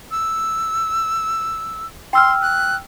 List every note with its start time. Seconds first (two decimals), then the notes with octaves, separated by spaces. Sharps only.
0.11 E6
2.13 G5 C6 E6 F6
2.42 F#6